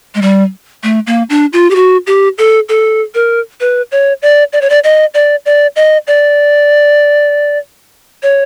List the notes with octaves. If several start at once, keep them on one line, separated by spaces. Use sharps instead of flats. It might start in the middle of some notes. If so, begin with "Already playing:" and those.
G#3
G3
A3
A#3
D4
F4
G4
F#4
G4
A4
A4
A#4
B4
C#5
D5
D5
C#5
D5
D#5
D5
D5
D#5
D5
C#5